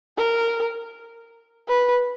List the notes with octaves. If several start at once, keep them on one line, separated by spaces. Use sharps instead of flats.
A#4
B4